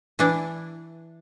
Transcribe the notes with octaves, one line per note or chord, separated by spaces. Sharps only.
E3 D4 E4